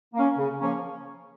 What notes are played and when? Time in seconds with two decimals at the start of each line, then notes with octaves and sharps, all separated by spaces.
0.14 A#3 C#4
0.37 C#3
0.60 F3 A#3 C#4